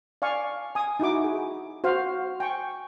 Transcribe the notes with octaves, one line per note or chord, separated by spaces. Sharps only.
D5 F5 G#5 C#6
G#5 D#6
D#4 E4 F#4 D6
G#4
F#4 C5 F5
G5 G#5 C#6